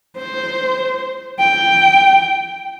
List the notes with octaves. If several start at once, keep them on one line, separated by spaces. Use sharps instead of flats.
C5
G5